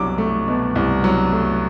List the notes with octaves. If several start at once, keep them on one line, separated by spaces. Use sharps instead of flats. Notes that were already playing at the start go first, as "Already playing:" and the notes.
Already playing: C2 B2 F#3 D6
A3
B2
C2
F#3
A3